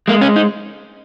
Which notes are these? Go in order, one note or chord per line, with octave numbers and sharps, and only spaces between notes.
G#3 A#3
C#4
D#4